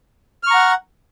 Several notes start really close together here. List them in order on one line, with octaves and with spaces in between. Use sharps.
F6 C#6 A#5 F#5